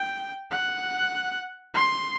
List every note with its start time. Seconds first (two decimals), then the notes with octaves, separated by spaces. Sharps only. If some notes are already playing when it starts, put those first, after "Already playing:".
Already playing: G5
0.50 F#5
1.74 C6